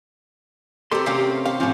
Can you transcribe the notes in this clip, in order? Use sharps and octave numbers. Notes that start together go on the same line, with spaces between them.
C4 G4 A4 A#4 C6
C3 C#4 F4 G4 F5 G5
G4 F5
A2 F3 C4 C#4 F4